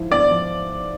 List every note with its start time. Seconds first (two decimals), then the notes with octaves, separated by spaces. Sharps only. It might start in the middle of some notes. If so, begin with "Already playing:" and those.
Already playing: G#2 F3 E4
0.11 B3 D5
0.31 F3